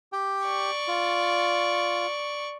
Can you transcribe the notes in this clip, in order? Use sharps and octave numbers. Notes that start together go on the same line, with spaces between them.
G4 G5
D5 C#6
F4